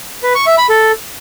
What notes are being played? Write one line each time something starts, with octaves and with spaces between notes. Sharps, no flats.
B4
C#6
E5
B5
A4